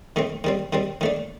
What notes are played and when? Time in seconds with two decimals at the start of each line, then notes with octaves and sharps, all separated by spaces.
0.16 D#3 A3 C4
0.44 D#3 G3 C4
0.73 D#3 G3 C4
1.01 D#3 A3 D4